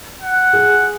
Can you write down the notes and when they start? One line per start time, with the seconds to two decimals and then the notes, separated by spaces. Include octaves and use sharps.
0.22 F#5
0.53 G#4